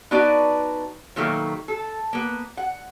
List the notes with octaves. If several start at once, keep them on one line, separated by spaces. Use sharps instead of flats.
B3 D4 D#4 F#4 B4 D5
B2 D#3 F#3 A3 A#3
A4
A#3 B3
F#5